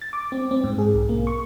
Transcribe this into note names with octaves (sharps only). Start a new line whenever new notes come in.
A6
D6
C4
C4
G#2
G#4
B1
A#3
C#6